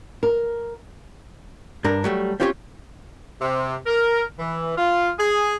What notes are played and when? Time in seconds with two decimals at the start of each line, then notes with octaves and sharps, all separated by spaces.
0.23 A#4
1.84 G2 D4 A#4
2.04 F#3 G3 A3
2.40 C4 C#4 F4 G4 C5 C#5
3.41 C3
3.86 A#4
4.39 E3
4.78 F4
5.19 G#4